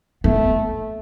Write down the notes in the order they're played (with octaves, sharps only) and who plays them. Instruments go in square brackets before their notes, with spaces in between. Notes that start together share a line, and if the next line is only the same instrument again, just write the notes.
[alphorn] A3 [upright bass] B3